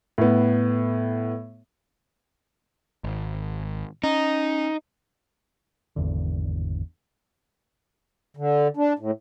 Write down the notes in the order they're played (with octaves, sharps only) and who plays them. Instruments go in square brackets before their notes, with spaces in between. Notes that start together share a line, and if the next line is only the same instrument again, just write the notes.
[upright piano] A2 B3
[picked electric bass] G#1
[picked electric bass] C#4 [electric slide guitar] D#4
[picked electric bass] G#1 E2 D3
[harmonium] D3
D4
A2